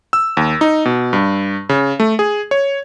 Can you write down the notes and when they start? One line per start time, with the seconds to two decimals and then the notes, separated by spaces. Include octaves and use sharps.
0.13 E6
0.37 D#2
0.61 D#4
0.85 B2
1.13 G2
1.69 C#3
2.00 A3
2.19 G#4
2.51 C#5